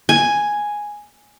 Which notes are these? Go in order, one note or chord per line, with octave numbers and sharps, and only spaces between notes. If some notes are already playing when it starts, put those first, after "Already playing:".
G#5